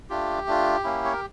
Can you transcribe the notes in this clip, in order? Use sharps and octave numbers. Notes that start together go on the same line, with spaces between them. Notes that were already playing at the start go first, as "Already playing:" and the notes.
A3 D4 F4 G4
A3 D4 F4
A#3 C#4 E4
C#5
A#4